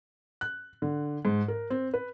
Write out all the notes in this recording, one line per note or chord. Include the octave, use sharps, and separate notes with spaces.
F#6
D3
G#2
A#4
C4
B4